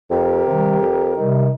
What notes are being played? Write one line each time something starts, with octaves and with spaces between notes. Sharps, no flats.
F2 G4 A#4
C3 D#3 G3
F2
C3 D#3 G3